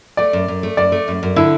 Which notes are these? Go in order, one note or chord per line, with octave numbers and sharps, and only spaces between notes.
A3 D5
F#2
F#2
A3
F#2 D5
A3
F#2
F#2
D3 E4